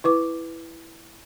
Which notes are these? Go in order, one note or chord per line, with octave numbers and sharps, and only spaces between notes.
E4 B4 D6